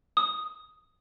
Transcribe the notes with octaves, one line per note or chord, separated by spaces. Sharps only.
D#6